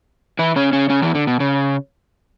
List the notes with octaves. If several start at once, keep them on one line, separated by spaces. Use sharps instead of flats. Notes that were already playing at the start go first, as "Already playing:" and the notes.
E3 E4
C#3 C#4
C#3 C#4
C#3 C#4
E2 E3
D3
B2
C#3